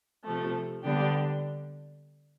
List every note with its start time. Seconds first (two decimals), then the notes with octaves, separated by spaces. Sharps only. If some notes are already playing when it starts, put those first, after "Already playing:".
0.24 C3 F3 A3
0.83 D3 G3 B3 D4 G4